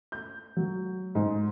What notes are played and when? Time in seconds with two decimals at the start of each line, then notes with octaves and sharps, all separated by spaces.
0.12 G6
0.57 F#3
1.15 G#2